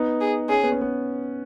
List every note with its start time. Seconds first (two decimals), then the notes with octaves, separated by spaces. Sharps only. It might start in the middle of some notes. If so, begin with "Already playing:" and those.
Already playing: B3 D#4
0.21 G#4
0.49 C#4 G#4
0.63 B3
0.72 C#4
0.81 B3